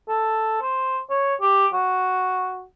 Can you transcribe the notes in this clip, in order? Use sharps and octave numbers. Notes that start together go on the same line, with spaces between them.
A4
C5
C#5
G4
F#4